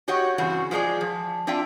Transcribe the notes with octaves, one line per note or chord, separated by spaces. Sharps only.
F#4 G4 C#5 D#5 F#5
G2 C#3 E3 C4 F#4
F3 G#3 C4 D4 G#4 D5
F3
C4 D4 F4 E5 G5